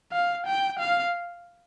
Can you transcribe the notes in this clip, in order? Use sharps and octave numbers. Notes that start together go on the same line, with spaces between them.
F5
G5
F5